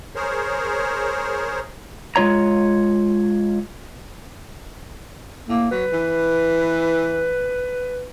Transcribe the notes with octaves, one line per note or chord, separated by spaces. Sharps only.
G#4 A#4 C5 C#5
G#3 F4 C#5 A#5
A2 A#3
F#3 B4
E3